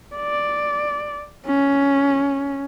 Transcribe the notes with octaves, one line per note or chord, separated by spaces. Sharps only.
D5
C#4